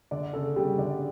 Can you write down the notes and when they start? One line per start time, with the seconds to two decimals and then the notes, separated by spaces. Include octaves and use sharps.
0.11 D3 D5
0.33 C#3 A4
0.56 C#3 G3
0.78 D3 D5